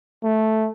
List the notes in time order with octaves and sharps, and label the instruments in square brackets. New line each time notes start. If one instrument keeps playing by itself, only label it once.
[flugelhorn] A3